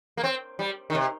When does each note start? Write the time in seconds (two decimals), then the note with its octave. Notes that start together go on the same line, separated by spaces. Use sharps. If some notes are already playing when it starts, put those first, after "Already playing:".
0.17 A#3
0.24 C4
0.59 G3
0.90 D#3
0.95 C3